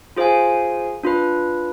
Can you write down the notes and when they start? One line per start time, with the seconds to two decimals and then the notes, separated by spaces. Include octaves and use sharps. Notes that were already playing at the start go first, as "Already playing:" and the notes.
0.16 F4 G#4 C5 F5 G#5
1.03 D4 F4 B4